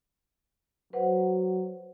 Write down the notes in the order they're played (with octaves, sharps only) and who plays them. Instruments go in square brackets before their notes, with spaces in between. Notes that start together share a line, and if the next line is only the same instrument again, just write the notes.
[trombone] F#3 [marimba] B4 C5 F#5